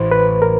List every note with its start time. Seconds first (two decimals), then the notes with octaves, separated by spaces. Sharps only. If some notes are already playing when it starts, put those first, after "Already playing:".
Already playing: A1 A2 E3 C5
0.11 B4
0.42 A#4